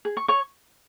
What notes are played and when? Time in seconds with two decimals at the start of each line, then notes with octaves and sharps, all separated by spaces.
0.05 G#4
0.17 C#6
0.28 C#5 C#6